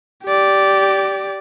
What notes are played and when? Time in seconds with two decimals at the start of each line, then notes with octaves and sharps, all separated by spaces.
0.25 G4 D5